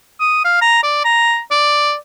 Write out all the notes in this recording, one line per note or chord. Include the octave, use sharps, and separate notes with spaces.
D#6
F5
A#5
D5
A#5
D5